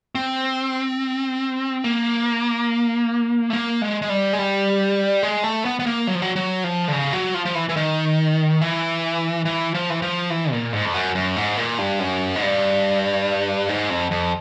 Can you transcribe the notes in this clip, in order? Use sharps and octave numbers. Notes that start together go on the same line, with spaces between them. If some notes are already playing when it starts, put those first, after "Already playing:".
C4
A#3
A3
A#3
G#3
G#3
G3
G#3
G3
G#3
A3
B3
B3
A#3
F#3
F3
F#3
F#3
F3
D3
C#3
F#3
F3
F3
E3
E3
D#3
E3
E3
F3
E3
F3
E3
A#2
G#2
F2
F#2
F#2
G#2
A#2
G2
F#2
G#2
G2
G#2
F2
F2